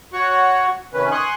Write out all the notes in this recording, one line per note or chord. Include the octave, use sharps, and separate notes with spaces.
F#4 C#5 F#5 C#6
C3 D#3 C#4 B4
G#5 C6 C#6 D#6 F#6